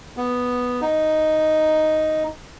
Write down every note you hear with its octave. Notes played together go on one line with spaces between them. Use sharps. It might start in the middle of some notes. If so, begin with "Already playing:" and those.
B3
D#4